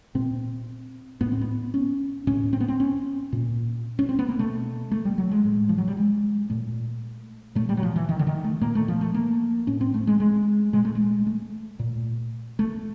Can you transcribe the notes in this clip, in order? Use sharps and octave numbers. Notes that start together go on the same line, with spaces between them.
A#2 C4
A2 B3
C4
B3
C#4
A2 C#4
C4
B3
C4
C#4
A#2
C#4
C4
B3
A#3
B2 A3
A3
G3
F#3
G#3
A2
F3
F#3
G3
G#3
A#2 A3
A#2 A3
G3
F#3
F3
E3
D#3
D3
D#3
A3
A#2 A#3
A3
F3
A3
A#3
A2 C#4
C4
A3
G#3
G#3
A#2 G#3
A3
G#3
A3
A#2
A3